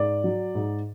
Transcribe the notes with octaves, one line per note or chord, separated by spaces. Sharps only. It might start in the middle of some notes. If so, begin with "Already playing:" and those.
Already playing: G#2 D5
F#3
G#2